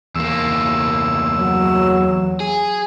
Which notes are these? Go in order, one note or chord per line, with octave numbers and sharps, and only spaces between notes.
E2 A#3 E6
F#3
G#4